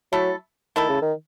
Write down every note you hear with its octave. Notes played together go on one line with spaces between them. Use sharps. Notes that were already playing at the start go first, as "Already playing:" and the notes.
F#3 A3 E4 A4
D#3 A3 E4 A4
C#3
D#3